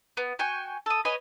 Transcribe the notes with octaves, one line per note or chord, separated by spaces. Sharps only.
B3
F#4 G5 G#5 C#6
A4 D#6
B4 C#5 D#5 G#5